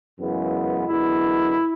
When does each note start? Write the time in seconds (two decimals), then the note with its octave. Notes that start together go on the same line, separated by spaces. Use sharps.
0.18 F#2 C#3 E3 G#3 B3
0.87 F#2 D3 G#3 B3 E4